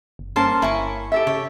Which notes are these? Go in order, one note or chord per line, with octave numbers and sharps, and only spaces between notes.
F#1
G2 A#3 C#4 C5 A5
G1 E4 G#5 C#6
G4 A4 E5
C#3 C#5